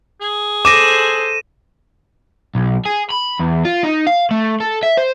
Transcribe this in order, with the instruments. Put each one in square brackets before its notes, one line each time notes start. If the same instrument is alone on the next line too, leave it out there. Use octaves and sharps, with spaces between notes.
[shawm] G#4
[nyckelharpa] A4 C5 [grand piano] D6 [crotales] A#6 D#7 E7
[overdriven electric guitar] B1
G#4
B5
E2
F4
D#4
F5
A3
A4
E5
C5